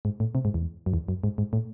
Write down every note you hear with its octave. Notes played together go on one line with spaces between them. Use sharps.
G#2
A2
C3
G#2
E2
F#2
E2
F#2
G#2
G#2
A2